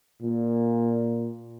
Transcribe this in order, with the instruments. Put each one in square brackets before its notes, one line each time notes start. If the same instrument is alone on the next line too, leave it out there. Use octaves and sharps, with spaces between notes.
[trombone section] A#2